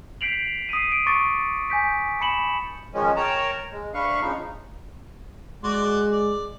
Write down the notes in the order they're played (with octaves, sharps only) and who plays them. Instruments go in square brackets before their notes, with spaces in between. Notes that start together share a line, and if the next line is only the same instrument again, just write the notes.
[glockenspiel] G6 B6 C7 D7 F7 F#7
D#6 B6 C7 D#7
D7
C#6 D6 A6 C#7
G#5 G6 B6 D7
A5 B5 C#7 E7 F#7
[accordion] D#3 F3 G#3 C#4
A#4 C#5 G5 A5 A#5
G#3
D2 D4 B4 F5 C#6
C#3 F3 D#4
[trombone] G#3 [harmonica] F#4 D5 C6
[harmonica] D5